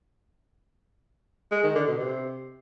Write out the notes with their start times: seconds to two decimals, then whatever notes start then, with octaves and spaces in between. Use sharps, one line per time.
1.52 G#3
1.64 D#3
1.75 D3
1.87 B2
1.99 C3